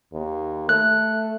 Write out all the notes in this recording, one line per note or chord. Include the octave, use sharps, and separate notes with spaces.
D#2
A3 F#6